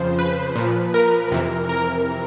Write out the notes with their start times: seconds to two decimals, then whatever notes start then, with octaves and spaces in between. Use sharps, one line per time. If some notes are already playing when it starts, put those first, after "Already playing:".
Already playing: F2 C#3 F3 C5
0.19 B4
0.55 A#2 F3
0.94 A#4
1.31 F2 C3 E3
1.69 A#4